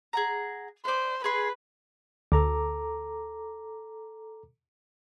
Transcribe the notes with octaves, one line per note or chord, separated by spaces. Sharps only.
G#4 F#5 A#5
B4 C5 D5
G#4 B4 C6
D2 A4 A#5 D6